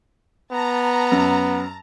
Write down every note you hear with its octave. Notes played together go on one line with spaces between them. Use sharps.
B3 A5 A#5
F#2